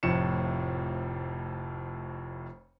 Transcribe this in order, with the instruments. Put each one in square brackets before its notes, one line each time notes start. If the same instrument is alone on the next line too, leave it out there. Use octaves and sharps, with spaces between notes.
[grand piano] F1 F2 A2 F3 C#7 E7